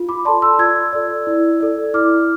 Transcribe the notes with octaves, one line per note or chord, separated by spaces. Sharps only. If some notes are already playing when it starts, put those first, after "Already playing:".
Already playing: F4
B5 D6
A4 D5 A5 C6
C6 E6
F4 E6 G#6
A4 D5
E4
A4 D5
E4 D6 F6